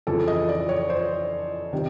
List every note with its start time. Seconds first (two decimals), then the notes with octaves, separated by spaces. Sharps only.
0.07 F2 C#3 E3 A4
0.28 D#5
0.49 D5
0.69 C#5
0.90 C5
1.73 C3 D#3